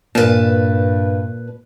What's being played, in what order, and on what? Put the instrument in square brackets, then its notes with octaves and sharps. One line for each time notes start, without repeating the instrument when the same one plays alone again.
[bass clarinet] G2 [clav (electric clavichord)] A#2 [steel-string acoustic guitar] B4 A5